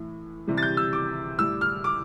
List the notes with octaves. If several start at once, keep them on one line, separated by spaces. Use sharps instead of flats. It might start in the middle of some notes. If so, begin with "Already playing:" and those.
Already playing: A2 E3 A3
C3 E3 G3
A6
G6
E6
D6
A2 G3 E6
F6
D6